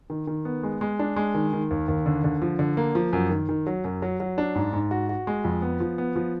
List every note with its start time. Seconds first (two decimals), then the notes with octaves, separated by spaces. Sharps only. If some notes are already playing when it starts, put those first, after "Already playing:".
0.10 D#3
0.27 D#3
0.45 B3
0.63 G#3
0.81 G#3
0.99 D4
1.16 G#3
1.34 D#3
1.53 D#3
1.71 D#2
1.88 D#2
2.06 D3
2.24 D3
2.42 F3
2.59 D3
2.77 A#3
2.95 F3
3.13 F#2
3.30 D#3
3.49 D#3
3.67 F#3
3.84 F#2
4.02 F#3
4.20 F#3
4.38 D4
4.55 G#2
4.73 G#2
4.91 F#4
5.09 F#4
5.27 G#3
5.45 F2
5.62 B3
5.80 F3
5.98 B3
6.16 F3